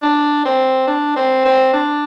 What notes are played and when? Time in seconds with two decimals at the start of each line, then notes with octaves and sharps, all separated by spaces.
0.02 D4
0.45 C4
0.88 D4
1.16 C4
1.45 C4
1.73 D4